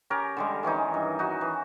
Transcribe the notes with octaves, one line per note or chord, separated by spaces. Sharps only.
C#4 G4 A#4
D3 G3 G#3
D#3 E3 C#4 D#4
G2
D#4 F#4
E3